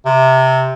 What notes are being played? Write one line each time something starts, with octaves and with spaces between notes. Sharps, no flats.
C3